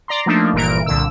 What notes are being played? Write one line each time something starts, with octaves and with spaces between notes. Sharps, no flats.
D5 A#5 C6
F3 A3 A#3 D4 D#4
G1 A#2 E3 A#4 D7
C2 A#2 D3 E6